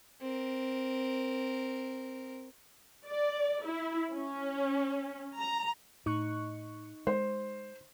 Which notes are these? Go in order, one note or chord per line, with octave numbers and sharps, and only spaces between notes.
C4 A#4
D5
E4
C#4
A#5
A2 D#4 C#6 F#6
G#3 C5